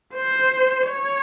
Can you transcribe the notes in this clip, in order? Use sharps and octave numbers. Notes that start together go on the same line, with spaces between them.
C5
C#5